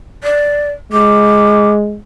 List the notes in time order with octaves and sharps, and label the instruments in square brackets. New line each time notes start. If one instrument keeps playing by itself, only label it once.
[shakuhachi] D5
[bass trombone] G#3 [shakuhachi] D6